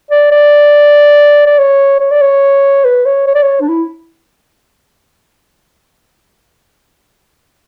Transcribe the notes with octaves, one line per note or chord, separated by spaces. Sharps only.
D5
D5
D5
C#5
C#5
D5
C#5
B4
C#5
C#5
D5
C#5
D4
E4